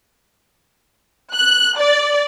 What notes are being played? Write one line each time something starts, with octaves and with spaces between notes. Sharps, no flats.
F#6
D5